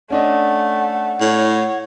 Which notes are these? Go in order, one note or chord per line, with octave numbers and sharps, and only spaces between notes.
A3 C#4 D4 D#5 F#5
A2 C#5